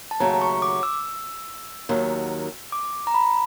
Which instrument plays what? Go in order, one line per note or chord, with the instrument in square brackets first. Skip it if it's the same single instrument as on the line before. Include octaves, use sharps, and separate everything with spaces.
[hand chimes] A5
[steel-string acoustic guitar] D#2 C#3 F#3 A3 [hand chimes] A#5
[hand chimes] C#6
D6
E6
[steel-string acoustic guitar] D#2 D#3 F#3
[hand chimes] D6
A#5
B5